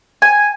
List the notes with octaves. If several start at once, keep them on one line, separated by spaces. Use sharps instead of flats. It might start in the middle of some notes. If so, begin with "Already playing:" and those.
G#5